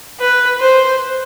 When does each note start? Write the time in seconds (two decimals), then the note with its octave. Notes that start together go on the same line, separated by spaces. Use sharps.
0.20 B4
0.60 C5